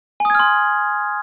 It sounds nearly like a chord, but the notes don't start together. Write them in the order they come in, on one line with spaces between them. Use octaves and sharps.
G#5 D#6 G#6 F6 C6